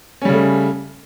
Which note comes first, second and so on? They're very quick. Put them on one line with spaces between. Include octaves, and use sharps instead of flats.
C#4 G3 C#3 A3